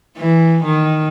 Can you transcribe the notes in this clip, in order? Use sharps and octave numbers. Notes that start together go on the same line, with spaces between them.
E3
D#3